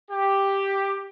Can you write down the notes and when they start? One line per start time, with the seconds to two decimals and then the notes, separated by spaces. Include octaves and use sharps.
0.11 G4